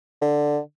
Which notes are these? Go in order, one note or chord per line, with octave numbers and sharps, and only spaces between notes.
D3